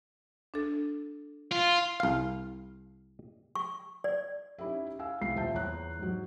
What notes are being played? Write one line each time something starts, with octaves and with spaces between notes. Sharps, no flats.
D4 A4
F4
C2 F5
C#6
D5
C#4 D#4 E4 G4 E5
F5 G#5 E6
C2 F5 C7
D#1 F4 E5 A5 G6
E2 C#5 A#5 F#6
G#2 F#3